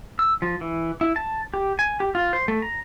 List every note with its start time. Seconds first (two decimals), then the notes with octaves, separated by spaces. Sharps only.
0.19 E6
0.42 F3
0.61 E3
1.01 E4
1.16 A5
1.54 G4
1.79 G#5
2.00 G4
2.15 F4
2.33 C5
2.48 A3
2.62 A#5